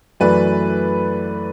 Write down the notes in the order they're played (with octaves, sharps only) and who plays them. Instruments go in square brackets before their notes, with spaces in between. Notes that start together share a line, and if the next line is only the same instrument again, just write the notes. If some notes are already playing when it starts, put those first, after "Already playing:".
[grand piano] F#2 E3 A3 B4 D5